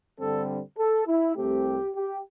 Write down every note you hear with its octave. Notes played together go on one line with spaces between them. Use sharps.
G2 D3 G3 C4 A4
A4
E4
C2 C3 A3 C4 G4
G4